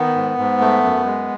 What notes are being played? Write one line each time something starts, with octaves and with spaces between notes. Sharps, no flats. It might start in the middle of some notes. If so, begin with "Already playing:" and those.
Already playing: D#3 B3
G#2
G#2
A3
F#2
G#3